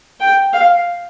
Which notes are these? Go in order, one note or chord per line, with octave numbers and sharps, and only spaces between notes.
G5
F5